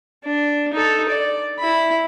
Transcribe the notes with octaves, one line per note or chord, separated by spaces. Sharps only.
D4
D#4 A4
D5
E4 B5